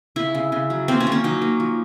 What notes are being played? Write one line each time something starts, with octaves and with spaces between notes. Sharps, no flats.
C#3 E4
C#3
C#3
F#3
A#3 C4
C#4
A#3
C#4
F#3 D#4
A#3
F3